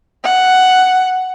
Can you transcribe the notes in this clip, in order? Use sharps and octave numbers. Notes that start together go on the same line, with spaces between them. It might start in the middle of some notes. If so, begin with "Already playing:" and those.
F#5